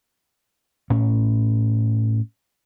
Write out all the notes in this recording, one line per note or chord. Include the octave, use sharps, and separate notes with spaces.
A2 C#4